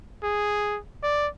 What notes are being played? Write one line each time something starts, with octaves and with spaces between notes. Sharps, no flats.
G#4
D5